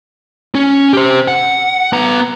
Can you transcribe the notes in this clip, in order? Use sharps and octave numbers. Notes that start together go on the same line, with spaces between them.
C#4
G4 C5
F#5
B3 A#5